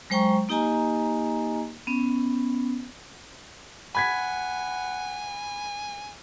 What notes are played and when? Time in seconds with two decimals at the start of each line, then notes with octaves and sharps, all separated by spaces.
0.10 F#3 G#3 C5 G5 A#5 C#6
0.49 A#3 D#4 G4 D#5 G#5 A#5
1.87 B3 C#4
3.95 F#5 G#5 B5 G#6 B6